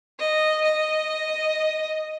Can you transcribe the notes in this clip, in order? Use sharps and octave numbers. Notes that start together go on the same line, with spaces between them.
D#5
D#5